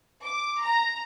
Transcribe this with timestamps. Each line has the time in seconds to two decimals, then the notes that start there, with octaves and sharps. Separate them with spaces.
0.23 D6
0.61 A#5